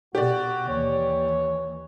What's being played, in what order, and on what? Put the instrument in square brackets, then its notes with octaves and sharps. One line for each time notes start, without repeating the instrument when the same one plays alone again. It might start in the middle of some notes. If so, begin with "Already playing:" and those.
[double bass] B2 [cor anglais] F#4 [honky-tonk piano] G4 D5
[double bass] D#2 E3 [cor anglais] C#5